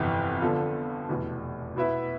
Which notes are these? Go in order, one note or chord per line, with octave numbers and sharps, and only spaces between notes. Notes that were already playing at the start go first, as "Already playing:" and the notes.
Already playing: G1 F2 C3 E3
D3 F3 B3 F4 A4
F1 E2 B2
B2 B3 E4 B4 E5